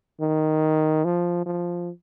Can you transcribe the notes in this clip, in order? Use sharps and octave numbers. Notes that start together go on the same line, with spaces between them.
D#3
F3
F3